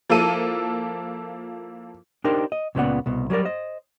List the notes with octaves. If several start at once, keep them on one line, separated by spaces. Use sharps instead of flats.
F3 A#3 E4 A4 D#7
D4 D#4 G4 A#4 C5
D#5
C#2 A#2 C#3 B3 D5 F#5
C2 B2
F#3 G3 G#4 A#4 D5
C5 D#5